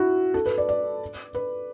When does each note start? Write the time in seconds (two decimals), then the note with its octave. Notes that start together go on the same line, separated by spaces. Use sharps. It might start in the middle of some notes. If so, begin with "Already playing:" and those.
Already playing: E4 F#4
0.34 A4
0.46 B4
0.58 D5
0.69 D5
1.35 B4